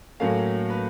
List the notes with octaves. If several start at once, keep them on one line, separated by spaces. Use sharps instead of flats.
A2 F#3 A#3 C#4 F5
B4